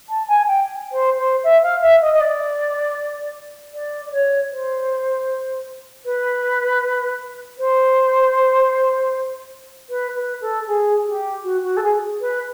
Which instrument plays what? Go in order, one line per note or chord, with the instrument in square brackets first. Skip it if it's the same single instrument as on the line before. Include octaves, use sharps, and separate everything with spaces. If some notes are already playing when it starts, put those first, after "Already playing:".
[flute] A5
G#5
G5
C5
C5
E5
F5
E5
D#5
D#5
D5
D5
D5
C#5
C5
B4
C5
B4
B4
A4
G#4
G4
F#4
F#4
A4
G#4
B4